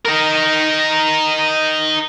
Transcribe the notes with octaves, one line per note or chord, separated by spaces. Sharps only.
D#4 A#4